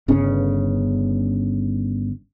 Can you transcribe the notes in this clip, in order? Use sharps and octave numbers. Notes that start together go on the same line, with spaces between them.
G1 C#3 C#4